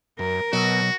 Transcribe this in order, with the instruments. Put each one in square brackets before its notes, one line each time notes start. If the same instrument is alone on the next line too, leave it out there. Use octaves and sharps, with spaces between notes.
[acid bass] F#2 [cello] A#4
[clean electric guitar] B1 [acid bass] B2 [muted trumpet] F#4